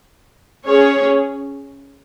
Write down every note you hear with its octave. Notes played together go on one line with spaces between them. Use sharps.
C#4 G#4 C#5